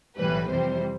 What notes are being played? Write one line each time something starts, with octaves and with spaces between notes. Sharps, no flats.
B1 A2 E3 G3 B4
F2 C3 E3 G3 C5